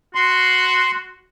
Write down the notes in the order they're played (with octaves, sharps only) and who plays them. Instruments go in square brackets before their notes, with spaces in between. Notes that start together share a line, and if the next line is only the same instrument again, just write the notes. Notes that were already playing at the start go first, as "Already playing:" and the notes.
[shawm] F#4 [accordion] C6